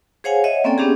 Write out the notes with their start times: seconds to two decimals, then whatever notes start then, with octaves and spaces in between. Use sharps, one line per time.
0.24 G#4 C5 C#5 F5 F#5 G#5
0.44 C#5 D#5 E5 F#5
0.64 A#3 C4 C#4 A4 D5 G5
0.78 B3 C#4 D4 G4 G#4